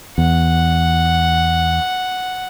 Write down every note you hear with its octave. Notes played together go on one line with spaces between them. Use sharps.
E2 F#5